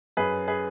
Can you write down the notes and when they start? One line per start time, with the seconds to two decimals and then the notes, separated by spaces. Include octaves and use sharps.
0.17 F#2 G#4 B4
0.48 G#4 B4